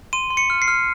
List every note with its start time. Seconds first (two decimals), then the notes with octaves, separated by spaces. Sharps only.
0.13 C6 D#7
0.30 C6
0.37 C#7
0.50 F6
0.62 C7
0.68 F6